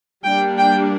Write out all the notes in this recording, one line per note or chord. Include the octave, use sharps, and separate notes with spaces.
G3 A#3 D4 G5
G5